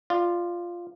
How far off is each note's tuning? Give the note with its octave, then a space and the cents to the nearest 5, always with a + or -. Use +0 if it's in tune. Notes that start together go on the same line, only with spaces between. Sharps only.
F4 +0 D5 +35